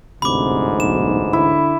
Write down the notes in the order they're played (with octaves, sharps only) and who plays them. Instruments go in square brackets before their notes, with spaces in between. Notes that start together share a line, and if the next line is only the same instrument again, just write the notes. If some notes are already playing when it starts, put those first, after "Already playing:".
[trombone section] A1 D2 G#2 [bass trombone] C3 [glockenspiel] B5 D6
[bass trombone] B1 [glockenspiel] E7
[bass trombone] D3 [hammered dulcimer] E4